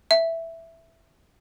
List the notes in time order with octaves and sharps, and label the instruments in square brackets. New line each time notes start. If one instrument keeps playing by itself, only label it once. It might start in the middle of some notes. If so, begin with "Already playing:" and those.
[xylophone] E5